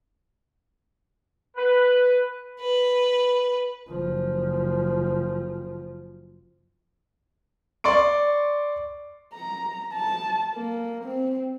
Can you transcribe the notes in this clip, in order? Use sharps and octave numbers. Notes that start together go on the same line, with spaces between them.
B4
B4
F#1 F3
D5 C6 C#6 D7
A#5
A5
A#3
C4